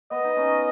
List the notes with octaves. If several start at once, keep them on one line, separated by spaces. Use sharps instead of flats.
B3 D#5
D#4
C#4